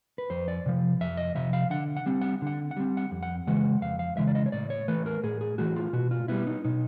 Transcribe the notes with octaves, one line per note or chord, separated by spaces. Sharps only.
B4
F2 C5
D5
C3 F3
F2 E5
D#5
C3 F3 E5
F5
D3 F#5
F#5
G3 C4
F#5
D3 F#5
F#5
G3 C4
F#5
F2
F#5
C#3 E3 G#3 F#5
F2 F5
F5
C#3 E3 G#3 E5
D5
D#5
C#5
A2 D5
C#5
E3 A3 B4
A#4
A2 G#4
G#4
E3 A3 F#4
F4
B2 F#4
F4
G3 B3 E4
D#4
B2 D#4